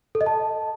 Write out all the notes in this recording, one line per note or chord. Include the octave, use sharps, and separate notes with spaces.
A4
D#5
A5